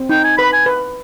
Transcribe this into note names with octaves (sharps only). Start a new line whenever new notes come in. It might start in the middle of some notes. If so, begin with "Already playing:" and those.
Already playing: C4
D#4 G5
G#5
B4 B5
G#5
B4